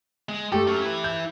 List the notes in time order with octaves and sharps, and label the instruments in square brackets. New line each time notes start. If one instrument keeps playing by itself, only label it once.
[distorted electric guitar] G#3
[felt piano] A3 G4 [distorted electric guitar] A4
[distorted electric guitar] F#3 C#4
E4 B4
[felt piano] G6